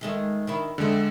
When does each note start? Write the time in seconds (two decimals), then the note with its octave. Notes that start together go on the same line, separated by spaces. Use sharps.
0.01 D#3 G#3 A3
0.47 D#3 D4 E4
0.78 F2 D3 G#3 A3